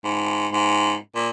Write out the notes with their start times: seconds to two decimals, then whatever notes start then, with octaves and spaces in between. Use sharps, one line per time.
0.04 G#2
0.52 G#2
1.15 A#2